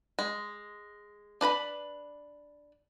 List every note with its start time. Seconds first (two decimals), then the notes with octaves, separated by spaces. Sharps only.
0.19 G#3
1.41 D4 B4 A#5 B5